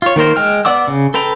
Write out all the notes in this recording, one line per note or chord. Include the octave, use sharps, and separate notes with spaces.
F4 C#5
D#3 A#3 A#4 C5
G#3 G5 F6
B3 D5 F#5 D6 E6
C#3
A4 B4 G5 A#5